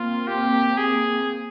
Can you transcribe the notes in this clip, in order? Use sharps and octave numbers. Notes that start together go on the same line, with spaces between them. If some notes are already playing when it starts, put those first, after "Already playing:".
Already playing: A#3 C4 F4
G4
G#4